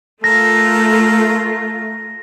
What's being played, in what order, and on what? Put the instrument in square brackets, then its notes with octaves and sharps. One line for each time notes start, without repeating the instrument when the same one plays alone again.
[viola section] A3 F4 [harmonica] A4 A#4 [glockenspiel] A#6